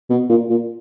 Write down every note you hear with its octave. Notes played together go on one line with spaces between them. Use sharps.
B2
A#2
A#2